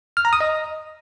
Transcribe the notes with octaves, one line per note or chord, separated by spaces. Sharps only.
F6
A#5
D#6
D#5